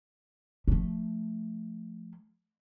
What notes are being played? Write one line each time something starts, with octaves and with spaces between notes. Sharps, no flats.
F3 A3